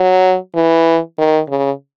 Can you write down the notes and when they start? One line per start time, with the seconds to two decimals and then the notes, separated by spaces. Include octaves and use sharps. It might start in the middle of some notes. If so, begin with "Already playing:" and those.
Already playing: F#3
0.55 E3
1.18 D#3
1.49 C#3